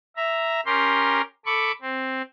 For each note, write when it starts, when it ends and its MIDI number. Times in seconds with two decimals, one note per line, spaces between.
0.17 0.61 76
0.17 0.61 82
0.66 1.21 61
0.66 1.21 67
0.66 1.21 70
0.66 1.21 84
1.46 1.72 69
1.46 1.72 83
1.46 1.72 85
1.46 1.72 86
1.82 2.22 60